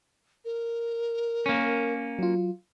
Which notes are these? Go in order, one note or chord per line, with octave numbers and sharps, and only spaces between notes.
A#4
A#3 C#4
F#3 F4